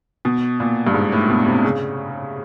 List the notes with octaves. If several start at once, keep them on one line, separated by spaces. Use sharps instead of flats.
B2
A#2
G2
G#2
A2
B2
C3
C#3